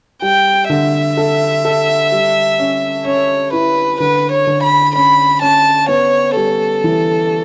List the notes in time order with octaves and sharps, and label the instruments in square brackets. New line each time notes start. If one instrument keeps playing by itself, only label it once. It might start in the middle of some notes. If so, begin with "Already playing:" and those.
[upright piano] G3 [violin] G5
[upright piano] D3 [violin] E5
[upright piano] A4
A4
G3
C#4
[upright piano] C#4 [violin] C#5
[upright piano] E4 [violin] B4
[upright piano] D3 [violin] B4
[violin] C#5
[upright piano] D3
[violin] B5
[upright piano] C#4 [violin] B5
[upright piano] C#4 [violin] A5
[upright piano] B3 [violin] C#5
[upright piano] G3 [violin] A4
[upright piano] E3